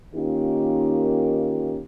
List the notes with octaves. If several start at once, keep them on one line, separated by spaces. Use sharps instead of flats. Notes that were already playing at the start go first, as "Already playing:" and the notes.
D#3 A#3 C#4 D#4 F4 G4